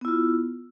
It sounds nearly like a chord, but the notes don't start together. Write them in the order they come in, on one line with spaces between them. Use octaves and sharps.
B3 E4 F4